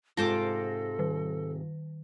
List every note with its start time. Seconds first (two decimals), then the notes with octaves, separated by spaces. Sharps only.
0.17 G#2 C3 F4 A4 C5 A5 D6 A#6
0.99 D#3